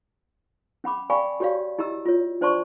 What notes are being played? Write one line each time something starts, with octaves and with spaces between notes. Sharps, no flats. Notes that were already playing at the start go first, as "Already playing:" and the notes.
C#4 F#5 B5 D6
D5 F5 G5 G#5 B5 C#6
F#4 G4 C#5 D5 F5
E4 G4 D#5 A#5 E6
F4 C#5
D4 C5 D5 A5 C6 C#6